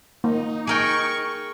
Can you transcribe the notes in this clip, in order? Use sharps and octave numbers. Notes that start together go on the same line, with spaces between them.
A#3 D#4
G#4 A#4 G5 C#6